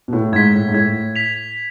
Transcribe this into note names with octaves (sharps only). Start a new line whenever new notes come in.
B2
A2
G#2 G#6 B6
A2
G#2
A2 G#6
B6 F7